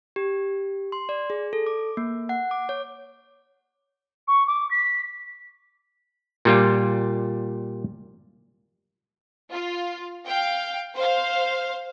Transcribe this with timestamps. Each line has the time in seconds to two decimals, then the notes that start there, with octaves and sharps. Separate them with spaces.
0.16 G4
0.92 C6
1.09 D5
1.30 G#4
1.53 A4
1.66 D6
1.97 A#3
2.29 F#5
2.51 D6
2.69 C#5
4.28 C#6
4.47 D6
4.71 B6
6.45 A#2 G3 F4
9.51 F4
10.26 F5 G5
10.96 C5 F5